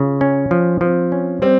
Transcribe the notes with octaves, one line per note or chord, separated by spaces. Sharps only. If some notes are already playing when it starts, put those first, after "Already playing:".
Already playing: C#3 F4
C#4
F3
F3 C4
C#4
G3 C4